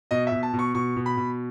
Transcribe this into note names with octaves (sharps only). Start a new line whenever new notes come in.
B2 D#5
B2 E5
A5
B2
C#6
B2 C#6
B2
B5
B2